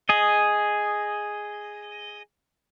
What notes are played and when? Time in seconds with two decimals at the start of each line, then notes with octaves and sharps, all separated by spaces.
0.09 G#4 D#5